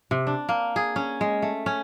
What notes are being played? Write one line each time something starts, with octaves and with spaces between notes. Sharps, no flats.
C3
D4
A#3
G#4
C#4
G#3
A3
C#4